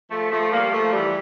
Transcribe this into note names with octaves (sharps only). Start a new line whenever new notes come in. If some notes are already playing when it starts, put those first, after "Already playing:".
F3 A3
F3 A3
G3 A#3
F3 A3
E3 G3